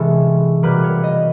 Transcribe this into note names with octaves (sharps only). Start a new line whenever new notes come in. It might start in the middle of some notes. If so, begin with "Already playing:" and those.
Already playing: C3 E3 G#3 C#4 A4
B2 G3 A#3 B4
C#5
D#5